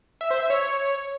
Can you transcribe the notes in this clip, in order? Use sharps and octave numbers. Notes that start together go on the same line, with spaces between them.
E5
C5
E5
C#5